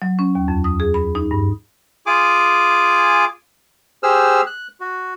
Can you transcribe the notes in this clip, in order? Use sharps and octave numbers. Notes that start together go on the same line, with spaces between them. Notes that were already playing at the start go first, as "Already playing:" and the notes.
F#3
C#4
D#2
F2
D#6
G#4
B5
D#4
G2
F4 G#4 G#5 D6
G4 G#4 C5 E6 F6
F#6
F#4